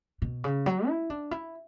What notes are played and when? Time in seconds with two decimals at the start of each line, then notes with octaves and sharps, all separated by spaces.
0.22 B2
0.44 C#3
0.66 F#3
0.88 E4
1.10 D4
1.31 E4